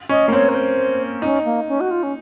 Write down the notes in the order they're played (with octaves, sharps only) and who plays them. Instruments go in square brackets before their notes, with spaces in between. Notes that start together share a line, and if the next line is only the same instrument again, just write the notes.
[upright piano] C#4 [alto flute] D#5
[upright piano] A#3
[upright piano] C4 [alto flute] C#5
[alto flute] A#4
C5
[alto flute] C#4 [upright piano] D#4
[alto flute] A#3
C#4
F#4
F4
C#4